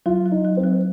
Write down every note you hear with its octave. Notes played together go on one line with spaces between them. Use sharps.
F#3 F4
F#3
D#4
F#3
C4
F#3